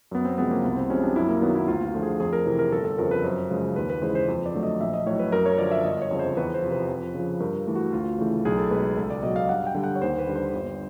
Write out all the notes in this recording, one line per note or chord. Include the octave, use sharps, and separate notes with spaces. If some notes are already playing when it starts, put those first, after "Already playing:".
F#2 B3
C4
C#3 F3 G#3 B3
A#3
C2 B3
C4
C3 F3 G#3 C#4
D4
F#2 E4
A#3
D#3 F#3 B3
E4
D2 F4
F4
D3 F3 A3
G#4
F2 G#4
A#4
C3 E3
A#4
G1 A4
A4
F2 C#3 F3 A#4
B4
F#2 C5
C#3 F3 G#3
D#2 B4
B4
C#3 E3 G#3 C5
C5
F2
D5
D3 F#3 A3
D#5
A#1 E5
D#5
A2 F#3 C#5
B4
F#2 A#4
C#5
D3 F3 D5
E5
G1 D#5
C#5
F2 C#3 F3
C5
E2 B4
C5
C3 F3
B4
F2
C#3 F3
G2 A#4
E3 A3
F#4
D2 F4
C#3 E3 A3
B1 G#4
A4
B2 G#3 B4
C#2 A4
D5
B2 F#3 D#5
F5
G2 F#5
G5
D3 G3
F#5
C#5
D#2 C5
B4
D3 G3
C5
G1